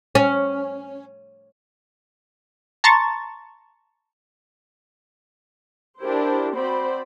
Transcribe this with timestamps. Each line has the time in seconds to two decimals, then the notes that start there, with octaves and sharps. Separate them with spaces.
0.15 C#4
2.84 A5 A#5 C6 C#6 A6
6.01 D4 E4 G4 A#4 C5
6.55 C4 F#4 C5 D5 B5